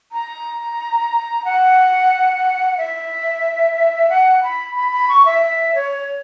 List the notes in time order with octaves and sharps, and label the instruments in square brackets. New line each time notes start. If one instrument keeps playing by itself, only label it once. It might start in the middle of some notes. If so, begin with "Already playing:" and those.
[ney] A#5
F#5
E5
F#5
B5
B5
B5
C#6
E5
E5
C#5